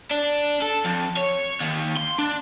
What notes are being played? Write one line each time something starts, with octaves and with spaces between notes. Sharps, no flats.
D4
A4
F2
C#5
D#2
C6
D4